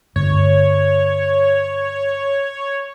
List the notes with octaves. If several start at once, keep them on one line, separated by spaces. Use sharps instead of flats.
G2 D3 A3 C#5